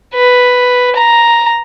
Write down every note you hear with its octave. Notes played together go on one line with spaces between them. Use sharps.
B4
A#5